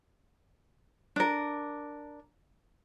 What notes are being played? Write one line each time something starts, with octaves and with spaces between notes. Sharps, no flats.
D4 A#4